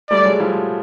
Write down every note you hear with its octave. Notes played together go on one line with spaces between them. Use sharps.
G3 A3 D5
F#3 G#3
F3 G3